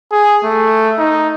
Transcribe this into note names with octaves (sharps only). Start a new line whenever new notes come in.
G#4
A3
D#4